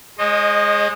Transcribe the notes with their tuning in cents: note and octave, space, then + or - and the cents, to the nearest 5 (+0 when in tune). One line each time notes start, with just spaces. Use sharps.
G#3 +0 C5 +45 D#5 -20